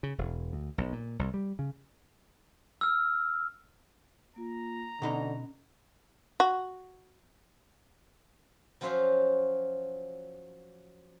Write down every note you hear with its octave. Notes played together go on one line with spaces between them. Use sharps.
C#3
E1
D2
B1
A#2
C2
G3
C#3
E6 F6
A#3 F4 A#5
B2 D3 C#4 D#4 B5
F#4
F3 F#3 C#4 C5 E5 F5